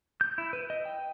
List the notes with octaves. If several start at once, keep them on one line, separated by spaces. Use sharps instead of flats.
G6
E4
B4
D#5
G5